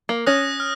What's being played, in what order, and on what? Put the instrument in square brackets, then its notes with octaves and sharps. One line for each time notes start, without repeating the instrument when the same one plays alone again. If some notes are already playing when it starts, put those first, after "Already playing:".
[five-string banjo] A#3
[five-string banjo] C#4 [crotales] D#6 F#6 A#6
[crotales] F6